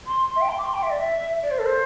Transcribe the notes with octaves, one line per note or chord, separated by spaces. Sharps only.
C6
E5
G5
C6
D6
C6
G5
E5
D5
E5
D5
C5
A4
C5